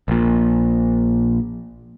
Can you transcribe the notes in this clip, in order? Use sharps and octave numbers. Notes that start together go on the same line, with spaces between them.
A#1 A#2